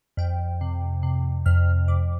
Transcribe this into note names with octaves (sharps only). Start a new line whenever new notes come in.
F2 G5
C3
C3
F2 F6
F2 D6